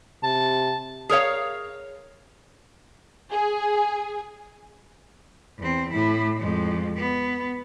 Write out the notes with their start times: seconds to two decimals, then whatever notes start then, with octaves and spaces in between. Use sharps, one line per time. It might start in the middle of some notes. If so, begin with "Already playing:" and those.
0.23 C3 A5
1.09 G#4 A#4 C#5 F5
3.31 G#4
5.59 E2 C4
5.92 A2 E4
6.39 F2 G#3
6.96 B3